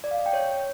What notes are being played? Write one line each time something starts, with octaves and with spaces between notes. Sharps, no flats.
D5
F5
D#5
G5
C#5